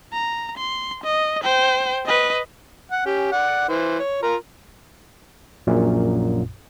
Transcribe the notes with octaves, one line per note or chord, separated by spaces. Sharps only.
A#5
C6
D#5
C5 G5
B4 D#5
F#5
C#4 G4
D5 F#5
E3 C5
C#5
F4 A#4
A#1 F#2 A#2